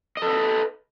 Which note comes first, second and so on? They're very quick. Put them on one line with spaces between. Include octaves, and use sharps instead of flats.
D#5 A4 B4